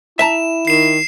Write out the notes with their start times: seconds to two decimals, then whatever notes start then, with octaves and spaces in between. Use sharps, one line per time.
0.19 E4 E5 A5 A#5 E7
0.67 D#3 C7 E7